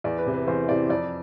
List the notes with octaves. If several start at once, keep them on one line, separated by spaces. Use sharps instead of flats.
E2 D5
B4
C3 E3
B4
E2 C5
C3 E3 D5
F2 D5